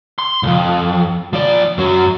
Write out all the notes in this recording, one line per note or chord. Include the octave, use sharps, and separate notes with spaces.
C6
C2 F2
F3 D5
F#2 F#3